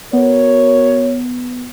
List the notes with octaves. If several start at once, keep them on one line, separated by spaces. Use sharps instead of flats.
B3 F#4 A#4 C#5